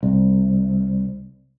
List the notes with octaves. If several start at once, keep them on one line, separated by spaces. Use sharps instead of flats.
C2